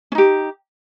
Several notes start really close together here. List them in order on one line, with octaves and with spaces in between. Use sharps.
C#4 D#4 G4